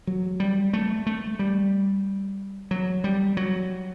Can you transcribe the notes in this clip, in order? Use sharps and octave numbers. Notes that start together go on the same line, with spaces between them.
F#3
G3
A3
A3
G3
F#3
G3
F#3